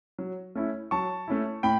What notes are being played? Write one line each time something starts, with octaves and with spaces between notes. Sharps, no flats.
F#3
A3 C#4 E4
F#3 A5 C#6
A3 C#4 E4
A2 G5 B5